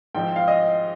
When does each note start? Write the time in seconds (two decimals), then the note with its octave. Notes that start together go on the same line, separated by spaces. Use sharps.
0.15 G#2 F3 C4 G5
0.36 F5
0.48 D#5